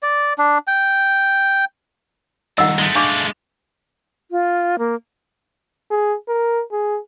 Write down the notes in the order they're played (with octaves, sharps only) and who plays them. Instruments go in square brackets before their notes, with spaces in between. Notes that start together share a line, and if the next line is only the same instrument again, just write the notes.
[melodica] D5
D4
G5
[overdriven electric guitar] G2 D#3 [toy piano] D#5 F#5 [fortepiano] E6
[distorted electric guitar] G#3 A3
[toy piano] D4 C#6 D6 [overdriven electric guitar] F5
[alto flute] F4
A#3
[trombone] G#4
A#4
G#4